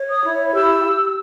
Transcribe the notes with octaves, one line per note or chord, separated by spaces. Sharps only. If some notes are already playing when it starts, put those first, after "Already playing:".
Already playing: C#5
D#6
E4
G4 E6
G4